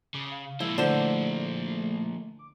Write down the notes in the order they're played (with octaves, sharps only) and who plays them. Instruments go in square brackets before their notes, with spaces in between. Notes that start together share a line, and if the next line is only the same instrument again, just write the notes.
[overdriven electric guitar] C#3 [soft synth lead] D6
[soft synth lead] F5
[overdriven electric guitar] F3 A#3 [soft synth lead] G#3 [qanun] E4
[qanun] D3 C5 [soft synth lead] A3
[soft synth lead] D6